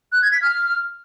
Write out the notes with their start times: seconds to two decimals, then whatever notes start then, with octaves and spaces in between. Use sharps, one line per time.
0.12 F#6
0.22 G#6
0.32 B6
0.42 F6